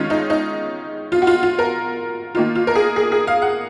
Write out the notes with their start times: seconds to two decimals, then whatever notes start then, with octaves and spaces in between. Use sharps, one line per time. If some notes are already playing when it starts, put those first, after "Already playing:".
Already playing: D#3 G#3 C#4 F4
0.10 D#4
0.30 D#4
1.12 F4
1.22 F#4
1.27 F4
1.43 F4
1.59 A#4
2.35 D#3 A#3 D#4 F4
2.55 F4
2.67 A#4
2.75 G#4
2.96 G#4
3.12 G#4
3.27 F5
3.42 F#5